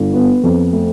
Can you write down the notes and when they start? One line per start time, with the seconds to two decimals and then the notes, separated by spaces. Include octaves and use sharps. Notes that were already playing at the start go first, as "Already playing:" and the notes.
Already playing: G1
0.14 B3
0.43 F2
0.73 A3